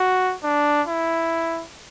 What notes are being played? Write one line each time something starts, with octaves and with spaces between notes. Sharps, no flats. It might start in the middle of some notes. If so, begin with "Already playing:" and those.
Already playing: F#4
D4
E4